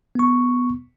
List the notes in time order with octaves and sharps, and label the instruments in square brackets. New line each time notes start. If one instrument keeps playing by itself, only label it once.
[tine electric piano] B3 C#6